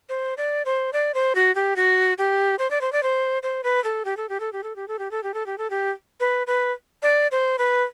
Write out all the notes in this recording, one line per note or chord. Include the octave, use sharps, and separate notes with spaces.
C5
D5
C5
D5
C5
F#4
G4
F#4
G4
C5
D5
C5
D5
C5
C5
B4
A4
G4
A4
G4
A4
G4
A4
G4
A4
G4
A4
G4
A4
G4
A4
G4
B4
B4
D5
C5
B4